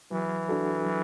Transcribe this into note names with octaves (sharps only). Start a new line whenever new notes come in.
E3 F#3
D4 F#4 A4
F#3